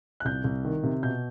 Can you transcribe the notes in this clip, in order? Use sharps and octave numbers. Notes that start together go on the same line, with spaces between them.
F#6
C2 G6
C2
D#3
C3
B2 G6